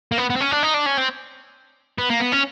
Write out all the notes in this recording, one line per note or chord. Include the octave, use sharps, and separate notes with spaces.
A#3
B3
B3
C4
C#4
D4
D#4
D4
C#4
C4
B3
A#3
B3
C#4